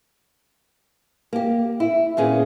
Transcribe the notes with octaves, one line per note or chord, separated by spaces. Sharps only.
A#3 G4
E4
A#2 D#3 A#3 B3 C#4 G#4